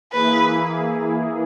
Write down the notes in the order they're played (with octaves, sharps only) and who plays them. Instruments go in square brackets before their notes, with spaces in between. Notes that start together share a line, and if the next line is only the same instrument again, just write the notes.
[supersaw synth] E3 A#3 E4 G#4 [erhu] B4